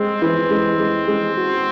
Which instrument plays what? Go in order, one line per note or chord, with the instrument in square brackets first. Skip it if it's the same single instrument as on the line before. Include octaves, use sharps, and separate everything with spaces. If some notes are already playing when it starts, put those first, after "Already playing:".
Already playing: [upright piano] G#3 [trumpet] C4
[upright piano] E3
G#3
G#3
G#3
F#4